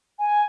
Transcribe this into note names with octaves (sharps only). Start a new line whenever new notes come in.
G#5